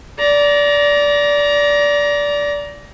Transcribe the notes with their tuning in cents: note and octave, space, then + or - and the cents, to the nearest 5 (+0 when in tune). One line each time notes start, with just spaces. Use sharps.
D5 -20 A#5 +15